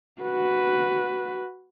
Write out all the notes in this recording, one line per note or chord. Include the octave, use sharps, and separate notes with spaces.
F#4 B4